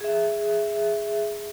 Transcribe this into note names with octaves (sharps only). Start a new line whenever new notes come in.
G#4 E5